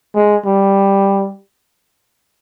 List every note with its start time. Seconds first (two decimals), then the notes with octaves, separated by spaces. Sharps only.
0.15 G#3
0.46 G3